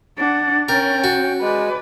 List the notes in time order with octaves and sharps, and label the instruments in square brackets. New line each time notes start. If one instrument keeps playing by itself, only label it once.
[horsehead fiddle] D4 F#5 [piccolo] A6
[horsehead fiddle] C#4 C#5 [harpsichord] A#4 [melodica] G5
[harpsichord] F#4
[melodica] G#3 [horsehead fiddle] B4 D5 [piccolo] G#5